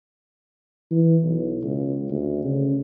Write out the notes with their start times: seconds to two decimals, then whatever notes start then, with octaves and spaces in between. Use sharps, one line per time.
0.91 E3
1.23 B1
1.63 C#2
2.10 D2
2.44 C#3